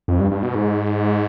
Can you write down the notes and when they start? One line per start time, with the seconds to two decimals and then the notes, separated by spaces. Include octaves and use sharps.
0.08 F2
0.20 G2
0.31 G2
0.43 B2
0.55 G#2